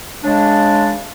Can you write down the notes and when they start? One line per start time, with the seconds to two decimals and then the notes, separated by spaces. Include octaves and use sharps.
0.24 C#3 G#3 D4